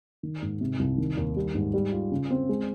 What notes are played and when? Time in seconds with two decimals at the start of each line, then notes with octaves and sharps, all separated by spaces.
0.23 D#3
0.42 G#2
0.61 C3
0.79 C2
0.98 D#3
1.17 D#2
1.36 G3
1.55 G#2
1.74 G3
1.92 F4
2.12 C#3
2.30 C4
2.49 G#3